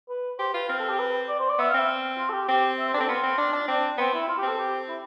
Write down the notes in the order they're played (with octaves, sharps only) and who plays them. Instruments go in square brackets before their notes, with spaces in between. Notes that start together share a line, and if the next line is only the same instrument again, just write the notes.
[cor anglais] B4
[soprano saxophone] G4 [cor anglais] C5
[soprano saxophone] F4 [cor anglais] B4
[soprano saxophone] C4 [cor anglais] F5
[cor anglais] A4
G4
B4
D5
C5
D5
[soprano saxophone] B3 [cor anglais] E5
[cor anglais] F5
[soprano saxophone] C4 [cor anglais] E5
[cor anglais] F4
A4
G4
[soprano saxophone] C4 [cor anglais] G4
[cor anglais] E5
C5
[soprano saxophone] D4
[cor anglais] A4
[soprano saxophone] C4
[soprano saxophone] B3 [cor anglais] F4
[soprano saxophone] C4
D4
D4
[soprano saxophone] C4 [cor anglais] D4
[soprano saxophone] B3 [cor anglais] C4
[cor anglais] E4
F4
G4
[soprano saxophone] C4 [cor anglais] A4
[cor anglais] G4
E4